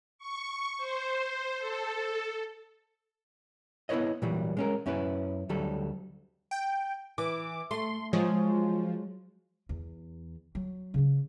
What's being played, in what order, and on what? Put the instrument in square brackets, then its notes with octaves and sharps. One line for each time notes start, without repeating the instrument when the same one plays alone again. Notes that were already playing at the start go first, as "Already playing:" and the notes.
[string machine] C#6
C5
A4
[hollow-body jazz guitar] B3 E4 F#4 B4 C#5 D#5
A#2 E3 F#3 G3
G#3 C#4 A#4
F#2 C#4 E4 B4
D2 F#3 G3 A4
[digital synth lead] G5
[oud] E3 [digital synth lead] D6
[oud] A3 [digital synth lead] C6
[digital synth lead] F3 [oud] F#3 G#3 D#5
[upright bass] E2
F#3
C#3 C#4